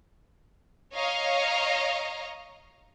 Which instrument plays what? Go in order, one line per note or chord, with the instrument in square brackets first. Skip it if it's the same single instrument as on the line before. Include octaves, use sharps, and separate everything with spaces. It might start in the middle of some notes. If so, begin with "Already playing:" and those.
[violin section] C#5 D#5 F5 A#5